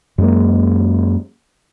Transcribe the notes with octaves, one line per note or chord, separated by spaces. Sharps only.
F#2 G#3 A#3